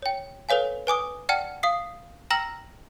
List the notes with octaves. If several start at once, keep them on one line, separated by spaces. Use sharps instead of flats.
C#5 G5
A4 B4 C#5 F5 G#5
B4 G#5 D6 D#6
D5 F#5 G5 A5 F6 C#7
F5 D#6 C7
G5 A#5 E6 F6 A#6 F#7